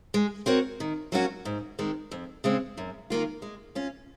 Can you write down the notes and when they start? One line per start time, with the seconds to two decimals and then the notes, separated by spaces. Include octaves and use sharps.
0.14 G#3
0.46 C4 F#4 A#4 C#5
0.80 D#3
1.12 F#3 A#3 C#4 F#4
1.45 G#2
1.79 D#3 G#3 C4
2.11 F2
2.44 C#3 G#3 C4
2.78 F#2
3.10 D#3 A#3 F4
3.42 G#3
3.75 C#4 F4